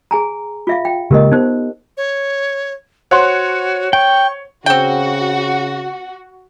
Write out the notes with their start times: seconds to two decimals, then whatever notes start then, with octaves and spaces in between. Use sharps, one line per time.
0.11 G#4 G#5 A#5
0.67 F4 E5 F5
0.85 G5
1.11 C#3 G#3 A#3 G4 A#4 D#5
1.32 B3 D#4 C5
1.97 C#5
3.11 F#4 C5 C#5 F#5 C6
3.93 G5 C#6
4.66 C#3 C4 F#4 G5